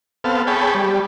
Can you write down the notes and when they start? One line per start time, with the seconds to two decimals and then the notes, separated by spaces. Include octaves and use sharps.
0.24 B3 C4 A4 F5
0.47 G#4 C#5 G5 A5 B5
0.75 G3